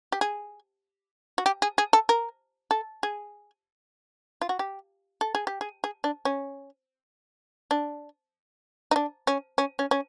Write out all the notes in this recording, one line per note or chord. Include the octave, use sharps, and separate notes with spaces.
G4
G#4
F#4
G4
G#4
G#4
A4
A#4
A4
G#4
F4
F#4
G4
A4
G#4
G4
G#4
G#4
D4
C#4
D4
D#4
D4
C#4
C#4
C#4
C#4